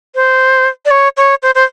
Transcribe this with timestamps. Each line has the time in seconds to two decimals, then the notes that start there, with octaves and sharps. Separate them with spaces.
0.15 C5
0.85 D5
0.91 C#5
1.17 C#5
1.43 C5
1.55 C5